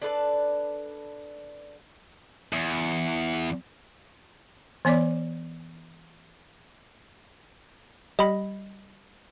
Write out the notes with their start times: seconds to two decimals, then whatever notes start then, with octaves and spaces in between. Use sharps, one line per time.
0.02 D4 A4 B4 D5
2.53 E2
4.85 E3 B3 C#5 D5 D6
8.19 G3 D#5 B5